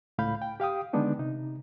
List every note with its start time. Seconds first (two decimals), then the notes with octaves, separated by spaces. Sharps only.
0.18 C#2 A2 F5 B5 G6
0.42 G5
0.60 G4 F5 G5 D#6
0.93 D3 D#3 G#3 B3 D4 D#4
1.19 C3 D#4